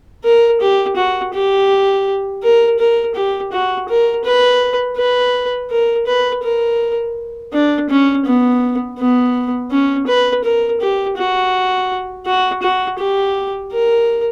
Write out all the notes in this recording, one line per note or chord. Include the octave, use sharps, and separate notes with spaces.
A#4
G4
F#4
G4
A#4
A#4
G4
F#4
A#4
B4
B4
A#4
B4
A#4
D4
C#4
B3
B3
C#4
B4
A#4
G4
F#4
F#4
F#4
G4
A#4